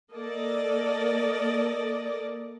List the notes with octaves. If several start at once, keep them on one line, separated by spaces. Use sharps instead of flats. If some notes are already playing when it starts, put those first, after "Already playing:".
A#3 A4 D5 D#5